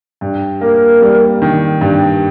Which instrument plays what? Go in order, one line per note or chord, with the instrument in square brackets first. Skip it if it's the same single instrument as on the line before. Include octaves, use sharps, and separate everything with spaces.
[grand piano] G2
[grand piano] A#3 [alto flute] A#4
[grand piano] G3
D#3
G2